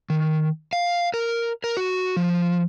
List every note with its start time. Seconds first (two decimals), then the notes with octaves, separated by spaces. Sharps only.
0.10 D#3
0.73 F5
1.14 A#4
1.64 A#4
1.77 F#4
2.17 F3